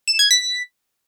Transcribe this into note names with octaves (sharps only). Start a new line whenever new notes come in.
E7
G#6
B6